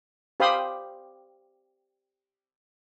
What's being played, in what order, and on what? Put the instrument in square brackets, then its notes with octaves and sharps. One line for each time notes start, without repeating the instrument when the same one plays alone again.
[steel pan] G4 C5 F5 B5 C6 D#6